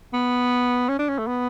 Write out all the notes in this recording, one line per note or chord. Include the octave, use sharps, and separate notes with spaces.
B3
C#4
D4
C#4
A3
B3